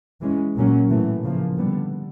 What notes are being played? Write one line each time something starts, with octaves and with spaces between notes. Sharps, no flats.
E3 G#3 C#4
A#2 F#3 A#3 C#4
A2 E3 A3
C#3 F3 A#3
D3 G3 B3